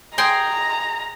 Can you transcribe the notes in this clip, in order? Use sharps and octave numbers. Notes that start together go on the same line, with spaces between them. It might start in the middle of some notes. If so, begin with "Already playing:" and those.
G#4 G5 A#5 C6